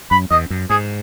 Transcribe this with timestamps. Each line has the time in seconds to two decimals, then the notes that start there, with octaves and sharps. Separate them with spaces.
0.11 F#2 B5
0.31 E2 D#5
0.50 F#2
0.70 G#2 G#4